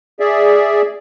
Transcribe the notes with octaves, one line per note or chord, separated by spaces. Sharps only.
G#4 D5 E5